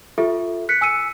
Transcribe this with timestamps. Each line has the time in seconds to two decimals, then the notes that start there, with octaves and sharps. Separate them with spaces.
0.18 F4 G4 A4 E5
0.69 F#6 B6 C#7
0.81 G#5 E6 C#7 D#7